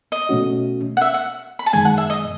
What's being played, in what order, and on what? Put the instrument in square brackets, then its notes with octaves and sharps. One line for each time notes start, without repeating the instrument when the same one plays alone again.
[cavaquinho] D#5
[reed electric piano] B2 A3 C#4 F#4
[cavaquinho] F#5
E5
F#5
B5
A5
[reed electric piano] F#2 D#3 G#3 [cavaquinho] G#5
[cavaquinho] F#5
E5
D#5